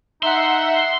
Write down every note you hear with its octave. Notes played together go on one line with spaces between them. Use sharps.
D#4 E5 F#5 C6